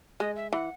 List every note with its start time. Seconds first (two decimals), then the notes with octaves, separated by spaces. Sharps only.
0.20 G#3 D#5
0.36 E5
0.53 E3 F#5